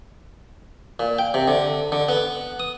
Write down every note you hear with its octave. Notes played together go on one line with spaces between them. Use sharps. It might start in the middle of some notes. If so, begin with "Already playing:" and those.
A#2
G5
C3
D3
D3
B3
D#6